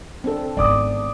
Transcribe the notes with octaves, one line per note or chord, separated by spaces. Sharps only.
C4 D4 A4
G#1 B3 D5 D6 D#6